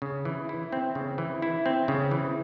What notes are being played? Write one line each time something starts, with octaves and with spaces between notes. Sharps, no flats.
C#3
E3
E4
C4
C#3
E3
E4
C4
C#3
E3